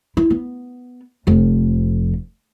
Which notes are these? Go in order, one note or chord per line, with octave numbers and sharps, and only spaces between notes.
E4
B3
F1 F2